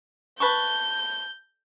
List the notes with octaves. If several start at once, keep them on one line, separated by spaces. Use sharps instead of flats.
B4 A5 C#6 G6